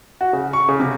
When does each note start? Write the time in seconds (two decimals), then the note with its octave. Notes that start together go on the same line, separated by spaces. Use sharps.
0.21 F#4
0.33 C#3
0.53 C#6
0.68 C#3
0.80 C3